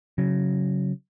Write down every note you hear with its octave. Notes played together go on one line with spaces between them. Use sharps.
C#3 F#3